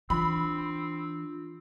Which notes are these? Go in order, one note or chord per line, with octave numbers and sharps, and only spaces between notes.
E3 C4 D4 F4 B5